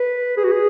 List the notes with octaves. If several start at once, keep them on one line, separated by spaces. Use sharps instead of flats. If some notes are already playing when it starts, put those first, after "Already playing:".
Already playing: B4
G#4
F#4
G#4